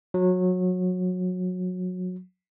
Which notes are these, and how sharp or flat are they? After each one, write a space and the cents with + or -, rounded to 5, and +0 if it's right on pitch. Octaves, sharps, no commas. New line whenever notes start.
F#3 -25